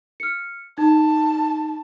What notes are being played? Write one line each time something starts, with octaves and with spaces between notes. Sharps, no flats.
F6 C#7
D#4 A5